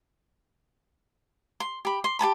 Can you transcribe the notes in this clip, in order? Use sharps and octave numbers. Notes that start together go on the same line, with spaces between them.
C6
G4 B5
C6
G4 G#5 A5 B5